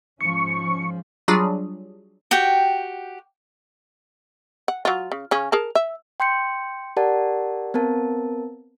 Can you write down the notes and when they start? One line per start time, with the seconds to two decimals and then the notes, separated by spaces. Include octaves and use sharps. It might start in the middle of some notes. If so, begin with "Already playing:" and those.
0.21 G#2 F3 C#4 C#6
1.28 F#3 G3 D4 F4 G#4
2.31 F#4 G4 G5
4.68 F#5
4.85 F#3 F4
5.12 C#3
5.31 C#3 C#4
5.52 G#4 A#4 A5
5.75 E5
6.20 G5 C6 G6 C#7
6.97 G4 A#4 D5 F#5 A5
7.74 B3 C4 A#4 A5